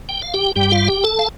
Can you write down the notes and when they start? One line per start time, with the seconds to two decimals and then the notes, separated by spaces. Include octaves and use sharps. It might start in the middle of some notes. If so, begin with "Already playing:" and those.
0.09 G5
0.22 F5
0.34 G4 G5
0.56 G2 G3 G4 G5
0.71 F4 F5
0.88 G4 G5
1.04 A4 A5
1.19 F5